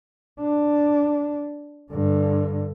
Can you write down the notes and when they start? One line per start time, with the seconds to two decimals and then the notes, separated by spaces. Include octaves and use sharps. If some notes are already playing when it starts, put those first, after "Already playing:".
0.39 D4
1.92 G2 D3